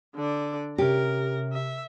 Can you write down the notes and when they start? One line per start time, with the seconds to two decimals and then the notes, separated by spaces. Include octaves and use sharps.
0.15 D3 D5
0.78 C3 C#4 G4 A#4
1.53 E5